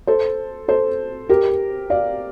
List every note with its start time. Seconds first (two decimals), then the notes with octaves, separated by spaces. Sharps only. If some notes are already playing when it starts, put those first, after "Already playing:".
0.07 A4 C5
0.68 A4 C5
1.29 G4 A#4
1.90 D5 F5